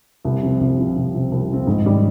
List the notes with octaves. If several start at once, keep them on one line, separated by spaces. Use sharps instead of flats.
C2
C3 F3 C4
C2
C3 F3 C4
C2
C3 F3 C4
C2
C3 F3 C4
G#2
D#3 G3 C#4 G4